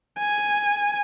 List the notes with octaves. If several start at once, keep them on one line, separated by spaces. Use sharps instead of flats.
G#5